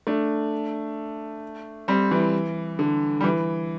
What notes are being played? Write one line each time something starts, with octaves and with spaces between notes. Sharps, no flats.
A3 D4
G3 C4
E3
D3
G3
E3